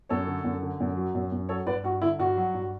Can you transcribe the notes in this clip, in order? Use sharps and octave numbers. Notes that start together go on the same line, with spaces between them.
F#2 A4 C#5
D3
F#2
D3
F#2
F#3
F#2
F#2
F#3 A4 C#5
G2 B4 D5
G2 F#4
D3 E4
G2 F#4
F#3
G2